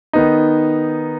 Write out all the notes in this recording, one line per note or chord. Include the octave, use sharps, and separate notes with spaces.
D#3 B3 D#4